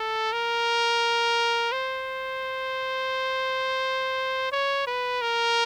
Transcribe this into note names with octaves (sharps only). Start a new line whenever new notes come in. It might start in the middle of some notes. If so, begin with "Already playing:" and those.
Already playing: A4
A#4
C5
C#5
B4
A#4